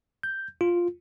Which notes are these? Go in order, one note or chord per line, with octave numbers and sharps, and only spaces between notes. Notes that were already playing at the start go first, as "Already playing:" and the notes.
G6
F4